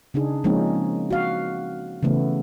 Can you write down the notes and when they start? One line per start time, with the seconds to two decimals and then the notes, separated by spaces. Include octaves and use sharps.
0.14 C#3 D4 D#4 G#4
0.44 F3 G#3 A#3 C4 C#4 D#4
1.10 F#4 F5
2.03 C#3 E3 A3 B3